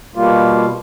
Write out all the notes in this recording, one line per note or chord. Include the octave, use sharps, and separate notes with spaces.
B2 G3 A#3 F4